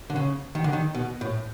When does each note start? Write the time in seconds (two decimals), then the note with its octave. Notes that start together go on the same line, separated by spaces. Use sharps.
0.10 D3
0.16 C#3
0.55 D#3
0.64 D3
0.73 D#3
0.95 B2
1.21 A2